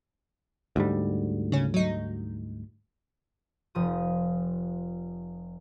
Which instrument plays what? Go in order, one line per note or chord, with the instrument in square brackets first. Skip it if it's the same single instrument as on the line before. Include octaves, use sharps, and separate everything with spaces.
[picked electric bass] D2 G#2 G3
[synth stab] C#3 C#4
F#3 D#4
[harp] F1 F3 D#6